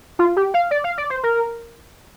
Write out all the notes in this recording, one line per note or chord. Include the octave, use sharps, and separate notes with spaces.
F4
G4
F5
D5
F5
D5
C5
A#4